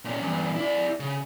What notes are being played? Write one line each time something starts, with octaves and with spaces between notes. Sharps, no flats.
A#2 C#4
E2 G2
E4 D5
C#3